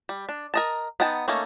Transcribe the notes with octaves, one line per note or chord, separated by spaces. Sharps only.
G3
D4
A#4 D#5 A5
B3 D#4 F#5 G5 A5
A3 A#3 C#4 D#4 A4